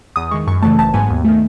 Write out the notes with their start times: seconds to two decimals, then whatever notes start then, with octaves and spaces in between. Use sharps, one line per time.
0.16 E2 D#6
0.31 D#3 G#3 C#6
0.47 F#2 C#6
0.62 C#3 E3 A3 A5
0.78 G#1 A5
0.94 G#2 F#3 B3 G#5
1.10 D#2
1.24 D#3 A3